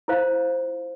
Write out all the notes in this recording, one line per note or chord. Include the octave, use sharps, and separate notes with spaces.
E4 F4 C5 F5